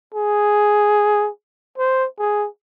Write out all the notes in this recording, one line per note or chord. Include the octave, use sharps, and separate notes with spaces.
G#4
C5
G#4